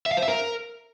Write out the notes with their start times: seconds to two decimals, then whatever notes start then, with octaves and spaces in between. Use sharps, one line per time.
0.06 E5
0.12 F5
0.17 C5
0.22 E5
0.28 A#4